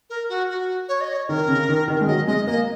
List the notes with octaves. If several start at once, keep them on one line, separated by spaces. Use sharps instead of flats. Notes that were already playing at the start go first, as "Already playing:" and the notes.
A#4
F#4
F#4
C#5
D#5
C#5
D#3 A#4
C#3
D#3
D#3
G#3
F#3 D#5
G#3 D#5
A#3 D#5